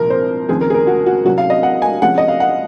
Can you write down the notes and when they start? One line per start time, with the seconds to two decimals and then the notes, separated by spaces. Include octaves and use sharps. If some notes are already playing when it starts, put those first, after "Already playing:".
Already playing: C2 A#2 F3 C4 A#4
0.10 C5
0.49 D#2 C#3 F3 C4 G#4
0.61 A#4
0.70 G#4
0.74 A#4
0.87 F#4
1.06 F#4
1.24 C2 C3 F#3 C#4 F#4
1.38 F5
1.50 D#5
1.63 F#5
1.82 G#5
2.02 C3 F3 G#3 C#4 F#5
2.18 D#5
2.28 F5
2.40 F#5